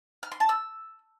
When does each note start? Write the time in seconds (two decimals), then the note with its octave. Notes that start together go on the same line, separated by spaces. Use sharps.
0.23 F6
0.32 C6
0.40 A5
0.49 E6